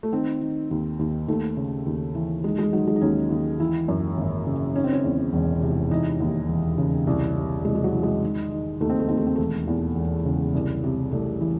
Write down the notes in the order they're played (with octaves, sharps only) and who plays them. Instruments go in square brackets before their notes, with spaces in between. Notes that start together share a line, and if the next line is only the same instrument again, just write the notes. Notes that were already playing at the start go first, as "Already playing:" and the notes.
[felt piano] A3
D#3 C4
D#3
D#2
D#2
D#2 A3
C#3
D#2
E3
D#3 G#3
G#3
D#3 F#3
G#3
D#4
D#2 C#4
D#2
E3 E4
F#2
G#1
C#3
D#3 C#4
C4
C#4
E2
E1
C3
E3 D#4
D#2
E1
C#3
C2
C3
C2 G#3
G#3
F#3
E3
G#3
D#3
D#3
D#2 A3
C4
A3
D#2 C4
A3
C4
E1 A3
E2
E1
C#3
C2
C3
C2 A3
E3